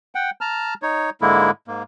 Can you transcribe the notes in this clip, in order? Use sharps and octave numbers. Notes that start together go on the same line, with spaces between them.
F#5 G5
A5 A#5 F6
D#4 C#5
G#2 D3 G#3 A#3 E4
G#2 A#3